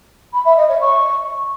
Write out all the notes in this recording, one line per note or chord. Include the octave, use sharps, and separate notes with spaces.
B5
E5
D#5
C#5
C#6